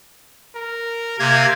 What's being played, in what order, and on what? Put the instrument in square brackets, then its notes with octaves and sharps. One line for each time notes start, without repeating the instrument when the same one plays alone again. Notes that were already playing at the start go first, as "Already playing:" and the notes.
[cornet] A#4
[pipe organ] C3 G#6 [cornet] A#3